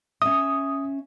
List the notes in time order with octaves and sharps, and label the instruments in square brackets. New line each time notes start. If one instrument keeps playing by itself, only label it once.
[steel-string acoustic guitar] C#4 E5 [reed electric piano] D#6